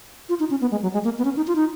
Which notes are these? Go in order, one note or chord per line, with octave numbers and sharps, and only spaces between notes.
F4
D#4
C#4
B3
G#3
F#3
G#3
A#3
B3
C#4
D#4
F4
D#4